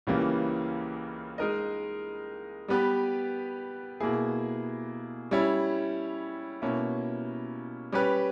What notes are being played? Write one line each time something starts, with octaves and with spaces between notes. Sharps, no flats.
C#2 C#3 E3 G3 A#3
G#3 D#4 A#4 D#5
G3 B3 G4 B4
B2 A#3 E4 G#4
G3 C#4 E4
B2 A#3 C#4 E4
G3 C#4 G4 B4